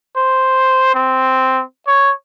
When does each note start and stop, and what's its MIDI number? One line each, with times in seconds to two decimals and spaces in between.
0.17 0.91 72
0.95 1.63 60
1.87 2.12 73